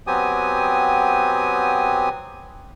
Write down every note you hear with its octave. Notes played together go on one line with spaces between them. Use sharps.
F#3 B3 C4 G4 G#5 D#6